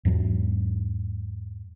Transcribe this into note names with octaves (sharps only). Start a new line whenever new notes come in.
E2 G#2 F#3